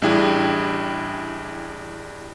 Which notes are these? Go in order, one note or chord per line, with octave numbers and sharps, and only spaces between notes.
A1 G3 D4 E4 G#4 G5